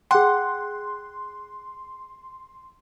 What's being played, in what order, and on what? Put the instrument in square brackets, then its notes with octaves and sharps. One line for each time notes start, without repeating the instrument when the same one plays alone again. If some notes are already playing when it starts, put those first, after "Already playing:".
[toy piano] G#4 G5 [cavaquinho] F#5 [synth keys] C6